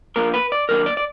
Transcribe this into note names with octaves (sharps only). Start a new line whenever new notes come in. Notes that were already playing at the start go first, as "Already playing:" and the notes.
F3 A#3 D4 A#4
B4
D5
D#3 F#3 A#3 D4 A#4
D5
D5